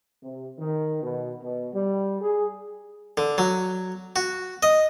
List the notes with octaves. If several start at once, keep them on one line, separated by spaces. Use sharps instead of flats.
C3
D#3
B2
B2
G3
G#4
D3
F#3
F#4
D#5